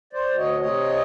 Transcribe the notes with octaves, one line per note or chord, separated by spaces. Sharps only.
C5 D5
D2
C#5 D#5
C3 C#5 D#5